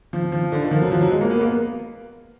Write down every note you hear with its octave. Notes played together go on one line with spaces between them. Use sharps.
F3
F3
D3
D#3
F3
F#3
F3
F#3
G#3
A#3
B3
A#3